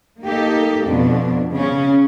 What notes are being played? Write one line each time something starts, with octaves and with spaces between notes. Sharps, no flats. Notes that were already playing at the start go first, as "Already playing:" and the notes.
A#3 D#4 G4 A4
F2 B2 D4
C#3 C#4